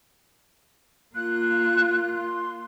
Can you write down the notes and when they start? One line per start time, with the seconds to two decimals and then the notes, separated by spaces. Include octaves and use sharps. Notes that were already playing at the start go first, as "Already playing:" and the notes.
1.15 A#3 F4 F#6
2.16 C6